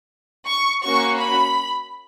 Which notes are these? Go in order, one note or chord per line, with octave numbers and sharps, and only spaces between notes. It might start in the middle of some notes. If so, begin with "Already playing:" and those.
C#6
A#3 C#4 F#4 C#6
B5